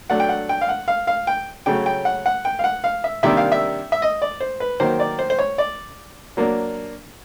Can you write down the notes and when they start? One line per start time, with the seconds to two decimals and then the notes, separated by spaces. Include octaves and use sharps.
0.10 F#3 A3 D4 F#5
0.20 G5
0.29 F#5
0.49 G5
0.61 F5
0.69 F#5
0.88 F5
1.07 F5
1.27 G5
1.66 C#3 F#3 A3 C#4 G5
1.86 G5
2.05 F#5
2.26 F#5
2.45 G5
2.59 F5
2.64 F#5
2.84 F5
3.04 E5
3.23 C3 D#3 G3 A#3 D4 E5
3.37 F5
3.52 E5
3.92 E5
4.02 D#5
4.22 D5
4.40 C5
4.60 B4
4.80 D#3 F#3 A#3 C5
4.99 D5
5.19 C5
5.30 C5
5.39 C#5
5.58 D5
6.37 F#3 A#3 D4